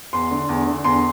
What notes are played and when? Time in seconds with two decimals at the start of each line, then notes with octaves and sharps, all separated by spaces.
0.13 E2 C6
0.31 D3
0.49 E2
0.67 D3
0.84 E2 C6